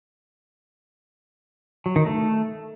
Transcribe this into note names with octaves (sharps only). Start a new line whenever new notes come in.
F#3
D#3
A3